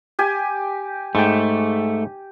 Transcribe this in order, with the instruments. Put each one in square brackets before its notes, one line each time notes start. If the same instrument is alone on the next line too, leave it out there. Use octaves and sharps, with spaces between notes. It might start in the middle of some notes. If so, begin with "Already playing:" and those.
[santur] G4 G#5
[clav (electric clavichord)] G#2 G5 [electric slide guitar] A3